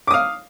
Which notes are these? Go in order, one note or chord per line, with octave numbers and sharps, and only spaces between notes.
F5 D6 D#6